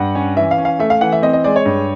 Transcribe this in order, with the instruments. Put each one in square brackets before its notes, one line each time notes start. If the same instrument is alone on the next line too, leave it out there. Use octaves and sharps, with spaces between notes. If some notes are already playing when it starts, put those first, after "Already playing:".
Already playing: [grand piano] G2 F#5
C#4
E3 E5
F5
C#4
F5
A3 E5
F5
E3 F#5
E5
C4 D#5
D#5
G#3 D5
C#5
G2